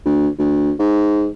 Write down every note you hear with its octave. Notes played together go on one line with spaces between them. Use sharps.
D2
D2
G#2